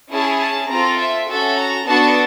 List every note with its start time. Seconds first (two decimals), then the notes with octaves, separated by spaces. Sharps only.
0.11 C#4 E4 G#4 A5
0.40 A5
0.69 C4 F4 A4 A#5
0.99 E5
1.28 C#4 F#4 A4 E5
1.57 A#5
1.87 B3 D4 F#4 A4 A5